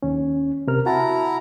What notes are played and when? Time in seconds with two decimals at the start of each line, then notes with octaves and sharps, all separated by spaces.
0.03 D#2 C#4
0.67 C3 A#4 F6
0.86 E4 F#4 F#5 A5 A#5